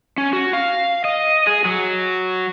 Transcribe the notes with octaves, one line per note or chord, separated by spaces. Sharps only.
C#4
F#4
F5
D#5
G#4
F#3